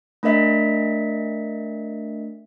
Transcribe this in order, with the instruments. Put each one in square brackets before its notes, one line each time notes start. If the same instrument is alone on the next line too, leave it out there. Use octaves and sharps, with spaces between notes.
[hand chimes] A3 D4 A#4 D#5 E5 B6